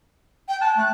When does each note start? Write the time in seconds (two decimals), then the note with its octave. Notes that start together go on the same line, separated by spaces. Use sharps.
0.49 G5
0.61 A5 F#6
0.77 A3 F#6